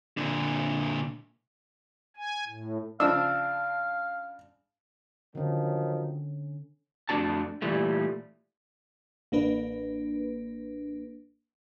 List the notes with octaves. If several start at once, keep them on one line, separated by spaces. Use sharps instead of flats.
A#2 D3
G#5
A2
C#3 F3 D4 F5 E6
D3 D#3 F3 F#3 C#4
F2 B2 A3 D4 F#4 A5
A#2 E3 G3 A3
A1 A#3 D4 B4